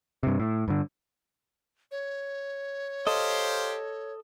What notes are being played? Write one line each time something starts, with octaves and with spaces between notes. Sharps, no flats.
G2 C3
A2
G2 D3
C#5
G4 A4 C5 D#5 F5